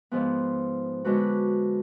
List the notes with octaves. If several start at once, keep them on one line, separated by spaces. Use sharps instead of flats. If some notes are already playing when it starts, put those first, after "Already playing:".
G#2 F3 B3
D3 G#3 B3 F#4 B4